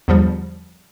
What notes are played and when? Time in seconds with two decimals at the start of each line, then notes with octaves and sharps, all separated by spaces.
0.08 E2 D3 F3 G3